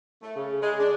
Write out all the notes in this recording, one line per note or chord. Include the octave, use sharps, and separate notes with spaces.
A3
C#3
G#3
D4